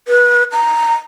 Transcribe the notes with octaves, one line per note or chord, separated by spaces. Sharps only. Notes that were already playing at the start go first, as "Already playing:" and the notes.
B4
A#5